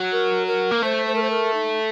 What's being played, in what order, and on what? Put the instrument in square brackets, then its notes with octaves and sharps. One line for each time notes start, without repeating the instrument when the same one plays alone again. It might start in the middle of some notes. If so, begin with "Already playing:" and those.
Already playing: [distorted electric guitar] F#3
[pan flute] A#4
A#4
[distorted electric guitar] A#3
[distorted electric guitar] A3 [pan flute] C5
[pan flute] C5
A#4
C5
A#4
D#4